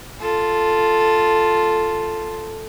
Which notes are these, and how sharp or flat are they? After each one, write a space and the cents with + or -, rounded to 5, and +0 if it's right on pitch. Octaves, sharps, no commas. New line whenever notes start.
F4 -5 A4 +0